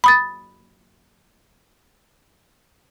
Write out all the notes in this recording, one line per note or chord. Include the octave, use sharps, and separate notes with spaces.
B5 D#6 A6